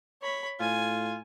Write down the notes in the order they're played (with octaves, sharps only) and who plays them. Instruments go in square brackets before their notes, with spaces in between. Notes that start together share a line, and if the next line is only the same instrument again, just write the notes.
[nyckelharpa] C#5 B5
[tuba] A2 [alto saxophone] F4 [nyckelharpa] G#5